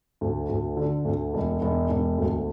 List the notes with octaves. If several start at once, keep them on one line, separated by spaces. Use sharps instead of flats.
D2
D2
D3
D2
E1
E1
E1
D2